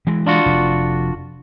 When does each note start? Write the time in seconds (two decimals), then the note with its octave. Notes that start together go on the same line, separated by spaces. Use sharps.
0.07 E3 G#3
0.27 D4 F4 F#4
0.46 F1